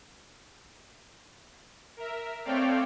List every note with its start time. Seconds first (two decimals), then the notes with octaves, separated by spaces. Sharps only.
1.97 A#4 E5
2.45 A3 C4 C#5 D5 F5 G5